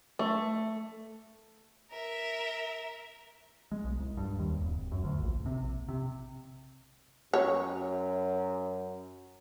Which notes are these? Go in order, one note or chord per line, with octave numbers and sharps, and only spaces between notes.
A3
A#4 E5
G#3
B1
C2
G2
D#2
D1
F#2
D2
A#1
C3
A#1
C3
F#2 C#5